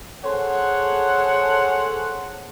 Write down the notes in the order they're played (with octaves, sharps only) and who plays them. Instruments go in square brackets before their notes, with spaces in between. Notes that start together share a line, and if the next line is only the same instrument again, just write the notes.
[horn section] G#4 A4 C5 C#5 F#5